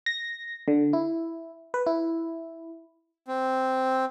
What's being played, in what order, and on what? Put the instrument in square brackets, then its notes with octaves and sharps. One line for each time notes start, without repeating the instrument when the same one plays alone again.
[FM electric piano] A#6
D3
E4
B4
E4
[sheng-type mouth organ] C4